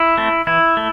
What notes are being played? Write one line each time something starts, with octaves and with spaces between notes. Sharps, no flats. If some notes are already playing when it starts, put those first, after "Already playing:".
Already playing: E4
A3 C4
E3 E4
A3